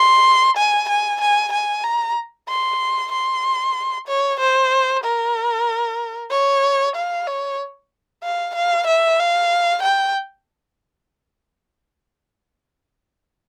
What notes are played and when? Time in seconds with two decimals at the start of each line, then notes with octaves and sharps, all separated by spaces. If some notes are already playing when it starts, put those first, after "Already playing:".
Already playing: C6
0.57 G#5
0.89 G#5
1.21 G#5
1.52 G#5
1.84 A#5
2.48 C6
3.12 C6
4.08 C#5
4.39 C5
5.04 A#4
6.31 C#5
6.96 F5
7.27 C#5
8.23 F5
8.55 F5
8.87 E5
9.19 F5
9.82 G5